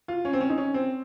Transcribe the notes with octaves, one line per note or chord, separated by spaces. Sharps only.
F4
C#4
C4
C#4
D#4
C#4
C4